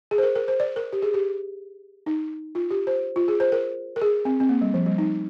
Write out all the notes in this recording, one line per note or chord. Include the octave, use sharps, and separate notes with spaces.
G#4
C5
A#4
A#4
C5
D5
A#4
G4
G#4
G4
D#4
F4
G4
C5
F4
G#4
C5
A#4
A#4
G#4
C4
C4
A#3
G3
F3
G3
D#4